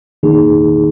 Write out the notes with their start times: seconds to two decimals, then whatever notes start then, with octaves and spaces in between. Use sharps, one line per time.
0.23 D#3 A#3 D#4 G#4